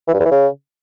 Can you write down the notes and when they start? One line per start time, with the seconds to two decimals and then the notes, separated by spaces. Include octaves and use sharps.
0.08 E3
0.14 G2
0.20 E2
0.25 E3
0.31 C#3